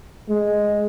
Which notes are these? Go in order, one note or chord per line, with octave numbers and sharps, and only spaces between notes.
G#3